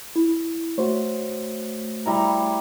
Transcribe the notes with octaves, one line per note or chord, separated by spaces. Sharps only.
E4
A3 F#4 C5 C#5
G3 E4 A#5